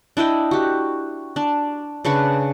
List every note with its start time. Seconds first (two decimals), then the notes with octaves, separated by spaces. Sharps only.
0.17 D4 E4 D#5 G5
0.51 F#4 G4
1.36 D4
2.05 C#3 D4 B4 C#6